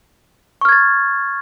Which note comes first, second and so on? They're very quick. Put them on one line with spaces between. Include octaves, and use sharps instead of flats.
C#6 F6 G#6 A6